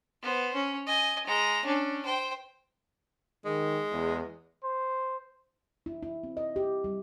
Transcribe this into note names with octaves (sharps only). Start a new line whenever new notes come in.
B3 C5
C#4
D#5 G#5
G#3 A#5
C#4 D4
C5 G5
D#3 G#3
E2
C5
E4
E4
C4
D#5
G4
G3